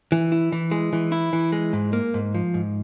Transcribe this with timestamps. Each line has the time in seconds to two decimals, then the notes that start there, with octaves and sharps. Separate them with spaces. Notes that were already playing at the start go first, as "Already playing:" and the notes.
0.12 E3
0.32 E4
0.52 E3
0.71 G#3
0.93 E3
1.12 E4
1.33 E3
1.52 G#3
1.73 G#2
1.93 A#3
2.14 G#2
2.34 F3
2.54 G#2